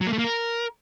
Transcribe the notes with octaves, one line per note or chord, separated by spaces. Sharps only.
F#3
A#3
A3
A#3
A#4